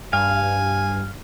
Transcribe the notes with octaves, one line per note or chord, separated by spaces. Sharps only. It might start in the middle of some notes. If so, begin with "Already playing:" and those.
G2 F5 G#5